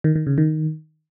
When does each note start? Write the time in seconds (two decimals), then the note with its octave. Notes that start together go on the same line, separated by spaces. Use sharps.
0.04 D#3
0.15 D#3
0.27 C#3
0.38 D#3